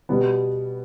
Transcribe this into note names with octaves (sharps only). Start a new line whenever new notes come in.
B2 G3 B3